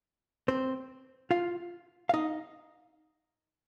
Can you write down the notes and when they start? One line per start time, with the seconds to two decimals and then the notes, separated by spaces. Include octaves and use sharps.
0.48 C4 C5
1.31 F4 F5
2.09 F5
2.14 D#4 D#5